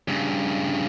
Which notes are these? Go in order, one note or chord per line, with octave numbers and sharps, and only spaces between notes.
G2 C#3